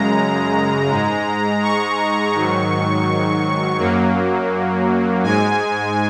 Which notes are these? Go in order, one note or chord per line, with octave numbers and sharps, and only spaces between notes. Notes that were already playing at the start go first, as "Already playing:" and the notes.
Already playing: F#2 C#3 G#3 A#5
G#2 G#3
C#6
G#2 D#3 F#3
F#2 F#3 A#3
G#2 G#3 G#5